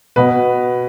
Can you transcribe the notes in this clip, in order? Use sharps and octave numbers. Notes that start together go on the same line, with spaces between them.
B2 B4